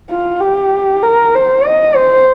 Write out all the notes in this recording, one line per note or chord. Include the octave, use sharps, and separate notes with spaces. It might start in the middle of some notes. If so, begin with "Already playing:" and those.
F4
G4
A#4
C5
D#5
C5